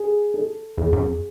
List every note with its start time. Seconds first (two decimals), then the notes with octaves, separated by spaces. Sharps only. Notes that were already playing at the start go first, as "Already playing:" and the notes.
Already playing: G#4
0.34 A4
0.77 E2 G#4
0.93 F#2
0.99 F2